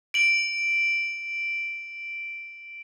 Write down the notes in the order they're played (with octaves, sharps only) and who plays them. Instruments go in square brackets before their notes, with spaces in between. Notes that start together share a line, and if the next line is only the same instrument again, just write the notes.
[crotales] D7 F#7